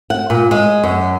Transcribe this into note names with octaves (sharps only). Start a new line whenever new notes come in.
F#5
A#2
G#3
F#2